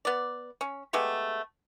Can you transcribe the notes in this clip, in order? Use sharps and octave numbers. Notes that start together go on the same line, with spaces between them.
B3 D5
C#4
G#3 A3 B3 G4